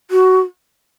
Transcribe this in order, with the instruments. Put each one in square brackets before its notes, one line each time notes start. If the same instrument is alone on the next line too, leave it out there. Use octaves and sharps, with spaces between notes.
[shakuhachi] F#4